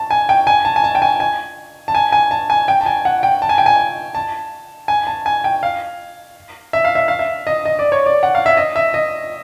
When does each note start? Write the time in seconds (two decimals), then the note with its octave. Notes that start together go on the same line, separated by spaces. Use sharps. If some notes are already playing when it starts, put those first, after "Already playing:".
Already playing: A5
0.11 G#5
0.29 G5
0.47 G#5
0.65 A5
0.76 G#5
0.84 A5
0.95 G5
1.02 G#5
1.20 G#5
1.88 A5
1.95 G#5
2.12 G#5
2.31 A5
2.50 G#5
2.68 G5
2.81 A5
2.86 G#5
3.05 F#5
3.23 G5
3.42 A5
3.49 G#5
3.58 G5
3.66 G#5
4.15 A5
4.88 G#5
5.07 A5
5.26 G#5
5.44 G5
5.63 F5
6.73 E5
6.85 F5
6.95 E5
7.08 F5
7.19 E5
7.47 D#5
7.65 D#5
7.79 D5
7.92 C#5
8.06 D5
8.23 F#5
8.35 F5
8.46 E5
8.57 D#5
8.76 E5
8.94 D#5